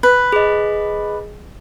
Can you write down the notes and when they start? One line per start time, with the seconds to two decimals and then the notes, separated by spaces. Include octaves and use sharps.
0.03 B4
0.32 G#4 D#5